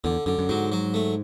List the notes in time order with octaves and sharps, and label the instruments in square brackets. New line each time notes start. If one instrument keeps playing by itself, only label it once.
[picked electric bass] E2 [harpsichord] D3
[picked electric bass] F#2 [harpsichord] D3
[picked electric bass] F#2
[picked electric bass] G#2 [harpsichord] F#3
[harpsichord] F#3
A3